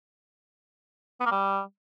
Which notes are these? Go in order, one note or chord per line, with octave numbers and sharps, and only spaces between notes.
B3
A#3
G3